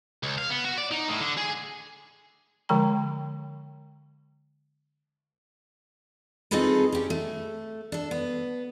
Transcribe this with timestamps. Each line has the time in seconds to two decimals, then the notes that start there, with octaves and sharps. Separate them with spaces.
0.23 C#2
0.38 F5
0.50 B3
0.65 F#4
0.78 D5
0.92 D#4
1.09 A2
1.20 D3
1.38 G#4
2.69 D3 F3 G#3 G5 A#5
6.51 C4 D#4 F4 G#4 A4 B4
6.92 C#4 G4
7.10 A3
7.92 D4 A4
8.11 B3